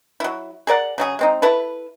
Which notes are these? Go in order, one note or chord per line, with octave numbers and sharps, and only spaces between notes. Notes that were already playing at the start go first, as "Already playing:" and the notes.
F#3 E4
G#4 A#4 D5 F#5
C#3 F#3 G#4
G#3 C4 D#4
E4 A4 B4